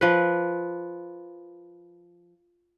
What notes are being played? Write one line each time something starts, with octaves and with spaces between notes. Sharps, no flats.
F3 B4